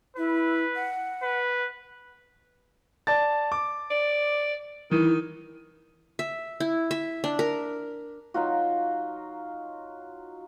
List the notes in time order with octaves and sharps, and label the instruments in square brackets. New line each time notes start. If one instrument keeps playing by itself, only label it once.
[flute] E4 [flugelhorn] B4
[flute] F#5
[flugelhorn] B4
[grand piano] D5 A5 A6
D6
[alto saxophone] D5
[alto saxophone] D#3 [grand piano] E3
[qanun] E5
E4
E5
D4
A#4
[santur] F#3 D#4 F4 F#4